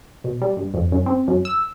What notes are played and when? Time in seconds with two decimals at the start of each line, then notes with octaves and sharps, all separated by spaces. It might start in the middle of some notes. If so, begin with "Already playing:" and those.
0.24 B2
0.42 G3
0.57 G2
0.74 F2
0.92 F#2
1.06 C4
1.28 F#2
1.45 E6